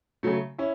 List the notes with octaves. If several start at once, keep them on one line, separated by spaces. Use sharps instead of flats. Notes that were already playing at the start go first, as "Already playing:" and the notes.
C#3 F#3 A3
C#4 E4